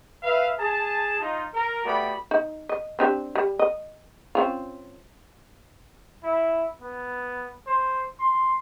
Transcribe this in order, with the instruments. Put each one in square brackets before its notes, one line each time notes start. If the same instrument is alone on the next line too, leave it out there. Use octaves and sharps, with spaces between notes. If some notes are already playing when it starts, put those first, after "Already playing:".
[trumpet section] B4 E5 F5
G#4 A5
D#4 F4
A#4
A3 B3 F#4 G4 D5 B5
[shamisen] D#4
D#5
C4 D4 G4
G3
D#5
C4 C#4 F4
[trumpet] E4
B3
C5
C6